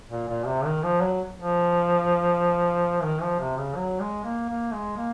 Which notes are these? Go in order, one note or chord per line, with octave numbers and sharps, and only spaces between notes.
A#2
A#2
C3
D#3
F3
F#3
F3
D#3
F3
C3
C#3
F#3
G#3
A#3
A#3
G#3
A#3